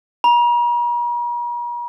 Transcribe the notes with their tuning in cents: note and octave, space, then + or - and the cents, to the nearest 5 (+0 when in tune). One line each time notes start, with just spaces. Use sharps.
A#5 +45